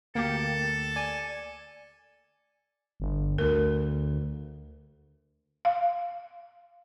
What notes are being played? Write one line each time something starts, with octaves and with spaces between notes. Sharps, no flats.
D2 A#3 G4 A4
D5 G#5
G1
D2 A#4
F5